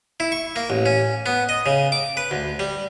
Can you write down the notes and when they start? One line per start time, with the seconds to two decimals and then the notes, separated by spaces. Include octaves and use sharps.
0.20 E4
0.32 C#6
0.56 A#3
0.70 A1
0.86 C#4
1.26 B3
1.49 D#5
1.66 C#3
1.92 D6
2.17 B4
2.31 D2
2.59 G3